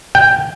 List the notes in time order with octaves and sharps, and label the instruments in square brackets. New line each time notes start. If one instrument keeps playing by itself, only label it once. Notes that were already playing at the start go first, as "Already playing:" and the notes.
[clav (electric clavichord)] G5